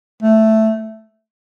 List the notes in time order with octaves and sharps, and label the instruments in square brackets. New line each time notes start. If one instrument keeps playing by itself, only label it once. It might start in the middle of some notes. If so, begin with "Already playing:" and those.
[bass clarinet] A3